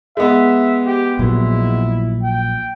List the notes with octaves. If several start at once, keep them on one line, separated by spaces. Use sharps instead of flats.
G#3 B3 E5
G4
A#1 A#2 F#3 E4
G5